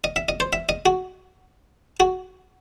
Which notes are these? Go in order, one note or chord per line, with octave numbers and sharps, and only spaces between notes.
D#5
E5
D#5
C5
E5
D#5
F#4
F#4